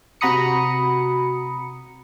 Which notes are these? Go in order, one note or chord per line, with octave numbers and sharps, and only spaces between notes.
C3 F#4 A#5 B5 D#6 C#7